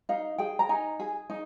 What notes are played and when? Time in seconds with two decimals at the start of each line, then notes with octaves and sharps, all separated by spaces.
0.09 D#4 F5
0.38 G#4 G5
0.59 A#5
0.69 D#4 G#5
1.00 G#4
1.30 D#4